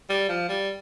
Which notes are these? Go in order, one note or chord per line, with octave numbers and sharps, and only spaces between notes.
G3
F3
G3